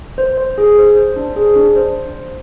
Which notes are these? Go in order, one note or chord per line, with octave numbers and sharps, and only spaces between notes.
C5
C5
G#4
C5
C5
D4
G#4
D4
C5